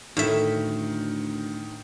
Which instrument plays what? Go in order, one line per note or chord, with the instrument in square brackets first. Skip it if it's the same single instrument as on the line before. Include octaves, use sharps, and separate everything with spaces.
[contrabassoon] D2 [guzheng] A2 E5 [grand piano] D#3